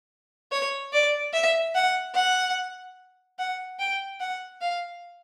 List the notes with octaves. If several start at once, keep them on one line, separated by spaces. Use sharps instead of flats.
C#5
D5
E5
F#5
F#5
F#5
G5
F#5
F5